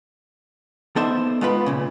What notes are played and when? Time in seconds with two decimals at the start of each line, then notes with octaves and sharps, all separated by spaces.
0.96 B3 D#4 A4 C5 D5 E5
1.41 G#3 B3 F4 A#4 B4 B5
1.66 B1 A#2 C#3